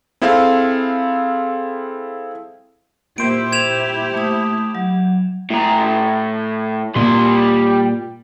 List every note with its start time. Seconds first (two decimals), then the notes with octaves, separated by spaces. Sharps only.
0.22 C4 E4 G#4 A4 F5
3.18 A#2 E4 G4 C5 D7
3.52 G#6 E7 F7
4.14 A3 D#6
4.75 F#3
5.50 A2 A#5
6.96 A#2 G3 A#3 C6